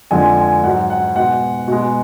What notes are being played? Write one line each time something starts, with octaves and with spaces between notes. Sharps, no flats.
F2 D3 F3 G#3 G#5
G#5
G#2 F#3 F#5
F#5
B2 G#3 F#5
B2 G#3